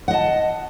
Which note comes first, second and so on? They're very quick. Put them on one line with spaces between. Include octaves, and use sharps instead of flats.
F#5 D#5 A5